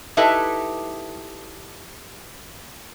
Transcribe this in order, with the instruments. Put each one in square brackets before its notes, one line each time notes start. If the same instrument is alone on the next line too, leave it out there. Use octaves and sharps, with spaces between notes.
[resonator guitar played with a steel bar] D#4 E4 G4 A4 B4 E5